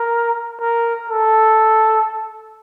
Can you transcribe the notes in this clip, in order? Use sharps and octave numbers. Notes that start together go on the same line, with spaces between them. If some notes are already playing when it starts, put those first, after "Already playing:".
Already playing: A#4
A#4
A4